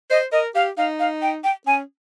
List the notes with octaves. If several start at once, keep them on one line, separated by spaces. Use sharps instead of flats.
C5 D#5
A#4 D#5
G4 F5
D#4 F5
F5
G5
G5
C#4 G#5